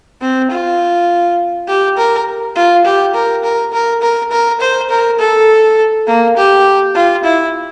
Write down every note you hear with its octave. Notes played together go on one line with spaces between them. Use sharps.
C4
F4
G4
A#4
F4
G4
A#4
A#4
A#4
A#4
A#4
C5
A#4
A4
A#3
G4
F4
E4